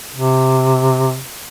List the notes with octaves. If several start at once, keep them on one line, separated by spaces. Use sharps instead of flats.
C3